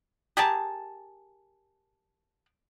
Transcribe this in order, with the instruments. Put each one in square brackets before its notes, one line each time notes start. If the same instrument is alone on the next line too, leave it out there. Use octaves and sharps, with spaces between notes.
[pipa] G4 G#4 A#4 A5